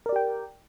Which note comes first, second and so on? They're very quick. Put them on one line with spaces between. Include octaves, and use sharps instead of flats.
A#4 D5 G4 G5